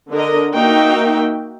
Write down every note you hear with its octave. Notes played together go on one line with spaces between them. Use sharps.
D3 A#4 D#5
A#3 D#4 F#4 A#4 E5 G5